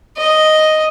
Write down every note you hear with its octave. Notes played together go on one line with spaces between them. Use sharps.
D#5